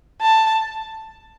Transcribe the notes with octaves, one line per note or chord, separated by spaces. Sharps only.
A5